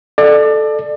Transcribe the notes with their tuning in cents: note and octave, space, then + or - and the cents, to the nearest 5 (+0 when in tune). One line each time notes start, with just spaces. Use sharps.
A4 -10 D5 +30